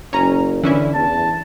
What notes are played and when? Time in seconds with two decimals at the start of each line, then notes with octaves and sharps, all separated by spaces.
0.13 F#1 C#4 A#5
0.63 D3 E3 C#4 E4
0.95 E2 A5